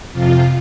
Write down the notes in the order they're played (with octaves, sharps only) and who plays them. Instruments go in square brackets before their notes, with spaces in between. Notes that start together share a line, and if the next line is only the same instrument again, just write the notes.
[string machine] F2 C3 F3 F4